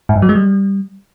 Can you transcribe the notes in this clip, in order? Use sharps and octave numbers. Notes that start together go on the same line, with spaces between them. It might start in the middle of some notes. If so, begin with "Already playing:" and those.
G#2
G2
F#3
G#3
G3